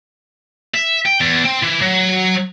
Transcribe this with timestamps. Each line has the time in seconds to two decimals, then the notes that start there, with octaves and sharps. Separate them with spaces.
0.75 E5
1.06 G5
1.21 E2
1.45 C4
1.63 E3
1.82 F#3